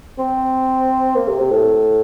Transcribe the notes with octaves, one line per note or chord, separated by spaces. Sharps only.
C4
A#3
C3
C3
A2